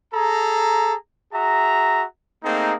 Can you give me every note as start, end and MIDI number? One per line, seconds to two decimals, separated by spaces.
0.14 0.94 68
0.14 0.94 69
0.14 0.94 82
1.33 2.04 66
1.33 2.04 68
1.33 2.04 76
1.33 2.04 82
2.44 2.75 57
2.44 2.75 58
2.44 2.75 60
2.44 2.75 63
2.44 2.75 68